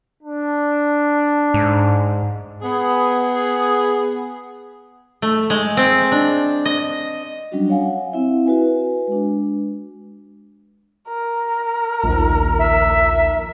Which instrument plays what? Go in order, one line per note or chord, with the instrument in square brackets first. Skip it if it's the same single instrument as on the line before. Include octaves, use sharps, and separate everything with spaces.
[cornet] D4
[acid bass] G#2
[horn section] B3 G#4
[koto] A3
G#3
C4
D4
D#5
[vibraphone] F#3 G3 C#4 D4 F#4
C#5 F5 F#5 G#5
C4 E4 E5
F#4 B4 G#5
G#3 D4
[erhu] A#4
[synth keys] A#1 D#2
[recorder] E5